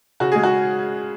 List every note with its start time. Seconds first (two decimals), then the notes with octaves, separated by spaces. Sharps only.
0.20 C#3 F#4
0.32 G#3 G#4
0.44 F#4